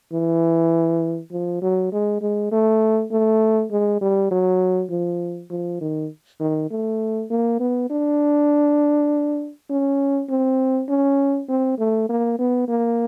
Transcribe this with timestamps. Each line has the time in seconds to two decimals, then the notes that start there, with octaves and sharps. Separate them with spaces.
0.13 E3
1.32 F3
1.62 F#3
1.92 G#3
2.22 G#3
2.51 A3
3.11 A3
3.71 G#3
4.01 G3
4.31 F#3
4.90 F3
5.50 F3
5.81 D#3
6.40 D#3
6.70 A3
7.30 A#3
7.60 B3
7.90 D4
9.70 C#4
10.29 C4
10.89 C#4
11.48 C4
11.79 A3
12.09 A#3
12.39 B3
12.68 A#3